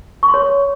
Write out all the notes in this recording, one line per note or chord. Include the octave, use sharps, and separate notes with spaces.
C#6
C6
C#5